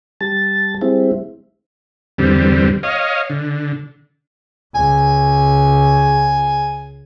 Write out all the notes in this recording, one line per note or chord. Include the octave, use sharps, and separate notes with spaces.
G3 A5 A6
G3 G#3 C4 E4
E2 G2 D3 G3 C4
C#5 D#5 F5
D3
C#2 G#5